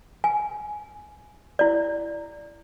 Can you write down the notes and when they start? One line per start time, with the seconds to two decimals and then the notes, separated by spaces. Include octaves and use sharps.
0.24 G#5
1.59 E4 D5